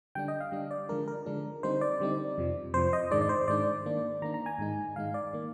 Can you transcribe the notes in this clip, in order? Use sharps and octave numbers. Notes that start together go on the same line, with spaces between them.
D3 G3 D4 G5
D#5
F5
D3 G3 D4
D5
D3 F3 G#3 D4 A#4
A#4
D3 F3 G#3 D4
D3 G3 C4 D#4 C5
D5
D3 G3 C4 D#4
F2 C3 F3
F2 C3 F3 C5
D#5
G#2 D#3 G#3 D4 D5
D5
C5
G#2 D#3 G#3 D4 D5
D#3 A#3 D4
D#3 A#3 D4 A#5
A#5
G#5
G#2 D#3 G#3 D#4
G#2 D#3 G#3 D#4 F5
D5
D#3 A#3